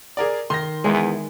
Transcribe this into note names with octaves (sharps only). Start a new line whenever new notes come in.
G#4 A#4 D5
D#3 C6 A#6
E2 G#3